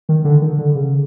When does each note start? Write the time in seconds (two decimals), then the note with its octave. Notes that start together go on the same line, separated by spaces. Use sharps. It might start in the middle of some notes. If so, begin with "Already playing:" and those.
0.09 D#3
0.24 D3
0.42 D#3
0.58 D3
0.75 C#3